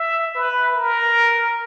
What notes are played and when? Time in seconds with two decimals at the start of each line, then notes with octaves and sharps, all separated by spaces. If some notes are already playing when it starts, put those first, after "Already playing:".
Already playing: E5
0.35 B4
0.76 A#4